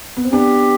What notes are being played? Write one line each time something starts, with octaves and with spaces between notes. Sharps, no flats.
B3
C4
B3 D4 G4